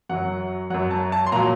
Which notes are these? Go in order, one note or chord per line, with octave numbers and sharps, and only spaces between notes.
F#2 F#3 F#5
F#2 F#3 F#5
A5
A5
C6
A#2 F#3 A#5